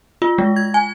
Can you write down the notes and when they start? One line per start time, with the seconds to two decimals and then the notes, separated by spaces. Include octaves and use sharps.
0.22 F4
0.38 G#3
0.56 G#6
0.74 G#5